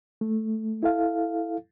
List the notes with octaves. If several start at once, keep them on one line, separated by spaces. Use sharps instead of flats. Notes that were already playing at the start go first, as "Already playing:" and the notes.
A3
E4 A4 F5